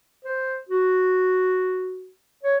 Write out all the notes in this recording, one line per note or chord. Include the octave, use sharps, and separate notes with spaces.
C5
F#4
C#5